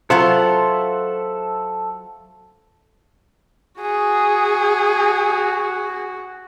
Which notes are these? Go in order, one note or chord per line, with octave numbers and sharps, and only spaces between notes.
F#3 F4 A4 C5 E5 F#5
F#4 G#4